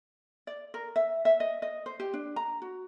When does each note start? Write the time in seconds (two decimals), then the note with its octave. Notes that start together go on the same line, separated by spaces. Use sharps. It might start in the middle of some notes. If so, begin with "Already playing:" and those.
0.47 D5
0.74 A#4
0.96 E5
1.25 E5
1.40 D#5
1.62 D#5
1.86 C5
2.00 G4
2.14 D4
2.36 A#5
2.62 F#4